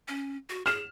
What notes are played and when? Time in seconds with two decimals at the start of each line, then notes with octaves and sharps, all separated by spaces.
0.08 C#4
0.50 F#4
0.66 G#4 F6 E7